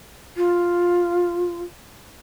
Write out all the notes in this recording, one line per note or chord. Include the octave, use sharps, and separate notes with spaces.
F4